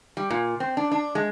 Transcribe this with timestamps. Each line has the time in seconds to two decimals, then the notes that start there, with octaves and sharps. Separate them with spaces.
0.17 G3
0.31 A#2
0.60 C4
0.77 D4
0.92 D4
1.15 G#3